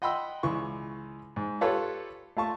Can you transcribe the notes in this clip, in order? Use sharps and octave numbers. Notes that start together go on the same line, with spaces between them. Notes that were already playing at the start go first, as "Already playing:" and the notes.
D#5 F#5 G5 B5 C6 E6
C#2 E3 C#6
G#2
F4 G4 A4 B4 C#5
A3 F4 A5 C#6